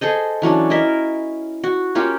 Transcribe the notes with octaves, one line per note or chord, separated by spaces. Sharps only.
G#4 A4 C5 D#5
E3 F#3 C#4 D4
E4 A#4 D#5 E5
F#4
A#3 C#4 F4 G4